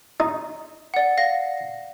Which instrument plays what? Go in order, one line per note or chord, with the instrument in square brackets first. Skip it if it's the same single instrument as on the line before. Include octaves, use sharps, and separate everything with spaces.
[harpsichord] D#4
[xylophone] D5 F#5
F5 A#6